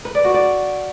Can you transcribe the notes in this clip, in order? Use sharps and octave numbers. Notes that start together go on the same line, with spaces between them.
B4
D5
F#4
D5